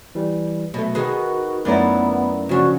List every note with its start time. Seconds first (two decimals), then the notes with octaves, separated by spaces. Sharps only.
0.15 E3 G3
0.74 B2 F#3 A3
0.95 D#3 F#4 G#4 B4
1.65 F#2 A3 B3 E4 B4 D5 A#5
2.49 C#3 F3 C#4 D4 F#4